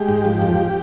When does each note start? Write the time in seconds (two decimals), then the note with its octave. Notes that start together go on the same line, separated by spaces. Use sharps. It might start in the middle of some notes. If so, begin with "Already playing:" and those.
Already playing: G#3 G4
0.09 G#2
0.25 F3
0.42 F2